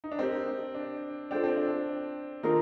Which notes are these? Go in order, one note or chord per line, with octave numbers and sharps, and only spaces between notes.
D#4
D4
C4 G4 A#4 D#5
D4
D4 F4 A4 C5 G5
C4
D4
D#3 D4 D#4 F4 A#4